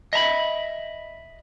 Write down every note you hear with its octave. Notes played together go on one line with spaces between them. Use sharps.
D#5 E5 A#5 B5